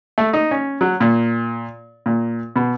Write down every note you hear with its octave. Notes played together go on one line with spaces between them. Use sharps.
A3
D#4
C#4
F#3
A#2
A#2
B2